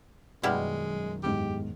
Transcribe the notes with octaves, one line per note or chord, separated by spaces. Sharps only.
F#2 B2 D#3 G3 G#3 E4 D#5 F6
E2 G#2 G4